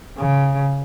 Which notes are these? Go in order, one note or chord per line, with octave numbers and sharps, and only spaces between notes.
C#3